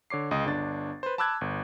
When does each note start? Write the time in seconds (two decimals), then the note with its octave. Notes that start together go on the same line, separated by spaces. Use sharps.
0.10 D3 C#5 D6 C7
0.31 C#2 D#5 D#6
0.45 G1 D4 A6
1.03 B4 C5
1.18 A5 B5 D6 E6 F#6 G#6
1.41 G1